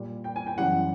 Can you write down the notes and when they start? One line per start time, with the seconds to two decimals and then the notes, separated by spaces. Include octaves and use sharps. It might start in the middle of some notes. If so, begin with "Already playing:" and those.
Already playing: A#2 G3
0.24 G5
0.36 G#5
0.47 G5
0.58 F#2 C#3 E3 G3 F#5